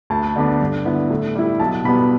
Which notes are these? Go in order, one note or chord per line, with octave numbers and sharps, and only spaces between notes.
D2 A5
D3 B3 D4
G2
D3 B3 E4
A2
G3 E4
B1 A5
B2 G3 B3 B5